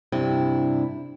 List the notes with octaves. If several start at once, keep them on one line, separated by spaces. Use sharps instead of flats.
G2 C3 D4 E4